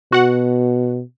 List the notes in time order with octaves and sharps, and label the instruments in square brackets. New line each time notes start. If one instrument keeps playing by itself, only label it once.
[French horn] B2 [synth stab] F#4 F#5